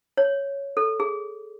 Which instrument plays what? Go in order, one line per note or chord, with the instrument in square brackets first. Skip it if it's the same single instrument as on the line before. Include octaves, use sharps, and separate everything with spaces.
[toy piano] C#5
A4
G#4